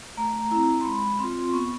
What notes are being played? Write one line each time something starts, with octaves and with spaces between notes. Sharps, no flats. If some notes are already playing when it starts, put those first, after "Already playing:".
A3 A#5
C4 E4 A#5
C6
G#3 B5
C4 F4 C6
B3 C#6